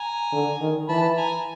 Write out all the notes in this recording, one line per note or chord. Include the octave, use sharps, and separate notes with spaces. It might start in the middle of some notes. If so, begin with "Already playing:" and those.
Already playing: G#5 A#5
D3
D#3
E3 A5 B5
G#5 A#5